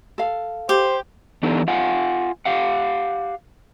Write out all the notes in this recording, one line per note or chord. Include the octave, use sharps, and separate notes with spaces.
A4 F5
G4 C5
E3 B3 D4 D#4 G4 A4
F4 F5 F#5 G#5
G4 F5 F#5